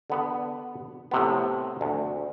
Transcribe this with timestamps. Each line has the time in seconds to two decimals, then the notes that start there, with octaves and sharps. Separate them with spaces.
0.10 D3 B3
1.11 A2 C3 B3
1.81 D2